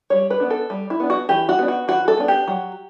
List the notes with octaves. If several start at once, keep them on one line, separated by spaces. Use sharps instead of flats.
G3 C#5
B4
B3 D4
A4
G3
E4
B3 D4
F#4
E3 G4
F#4
B3 D4
F#4
E3 F#4
A4
B3 D4
G4
F#3